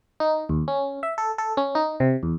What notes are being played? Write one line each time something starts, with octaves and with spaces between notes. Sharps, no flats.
D#4
D#2
C#4
E5
A4
A4
C#4
D#4
C3
E2